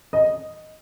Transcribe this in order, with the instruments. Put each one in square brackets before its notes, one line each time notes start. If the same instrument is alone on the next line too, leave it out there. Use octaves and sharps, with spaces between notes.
[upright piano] D#5